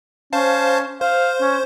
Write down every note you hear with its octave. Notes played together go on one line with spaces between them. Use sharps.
C#4 C5 F5 A5
C5 F5
C#4